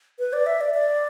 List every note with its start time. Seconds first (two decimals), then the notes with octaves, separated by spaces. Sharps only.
0.19 B4
0.33 D5
0.46 E5
0.61 D5
0.74 D5